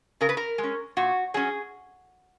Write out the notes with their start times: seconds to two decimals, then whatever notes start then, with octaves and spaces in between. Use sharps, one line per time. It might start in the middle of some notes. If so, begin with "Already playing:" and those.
0.21 C#3 A#4
0.29 B4
0.37 A#4
0.58 G#3
0.63 C#4
0.97 A#2 F#4
1.34 F#3 C#4 G#4